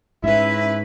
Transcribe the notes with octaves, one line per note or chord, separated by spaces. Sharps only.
G#2 C#4 E4 B4 E5